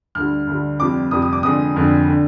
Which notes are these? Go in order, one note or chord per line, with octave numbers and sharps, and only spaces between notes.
D2 D3 G3 F6
D2 D3 G3
F1 F2 C3 G3 D6
F1 F2 C3 G3 D#6
D#6
D6
F1 F2 D3 G#3 D#6
F1 F2 D3 G#3
D3